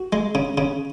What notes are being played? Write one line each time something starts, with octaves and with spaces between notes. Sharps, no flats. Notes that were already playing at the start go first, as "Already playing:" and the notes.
Already playing: F#4
G#3
C#3
C#3